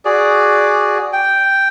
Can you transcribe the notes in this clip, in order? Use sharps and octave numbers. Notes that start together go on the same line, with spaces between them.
F#4 G#4 D5
G5